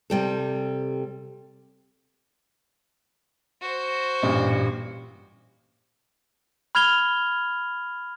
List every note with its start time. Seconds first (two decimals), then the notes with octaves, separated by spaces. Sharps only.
0.10 C3 G3 A4
3.61 F#4 C5
4.22 A1 G2 A#2
6.75 B5 F6 G#6 F7 G7